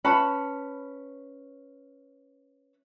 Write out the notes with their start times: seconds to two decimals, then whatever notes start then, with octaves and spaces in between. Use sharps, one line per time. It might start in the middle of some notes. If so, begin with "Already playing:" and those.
0.04 C#4 B4 A5 B5